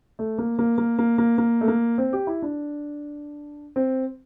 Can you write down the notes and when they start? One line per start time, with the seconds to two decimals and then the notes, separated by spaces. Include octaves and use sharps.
0.19 A3
0.38 A#3
0.59 A#3
0.78 A#3
0.99 A#3
1.18 A#3
1.38 A#3
1.61 A3
1.68 A#3
1.98 C4
2.13 G4
2.27 E4
2.42 D4
3.76 C4